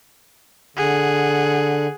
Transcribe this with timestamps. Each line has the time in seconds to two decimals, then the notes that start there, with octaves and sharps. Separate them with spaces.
0.77 D3 G#4 F#5